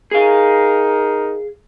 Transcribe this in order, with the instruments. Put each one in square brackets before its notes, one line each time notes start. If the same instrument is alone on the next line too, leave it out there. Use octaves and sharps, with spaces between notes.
[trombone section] D#4 A#4 [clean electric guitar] G#4 F5